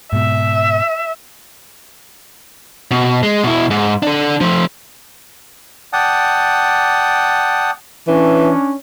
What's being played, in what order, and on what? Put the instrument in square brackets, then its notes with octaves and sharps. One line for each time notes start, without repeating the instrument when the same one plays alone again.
[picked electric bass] G#2 B2 [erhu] E5
[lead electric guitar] B2
G#3
B2 E4
G#2
D4 A4
F3 A3
[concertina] D5 F#5 G5 A5 D#6
[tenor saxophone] E3 [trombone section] C#4 D4